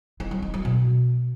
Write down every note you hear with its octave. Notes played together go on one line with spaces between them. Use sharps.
D#4
F#3
D#4
F#3
B2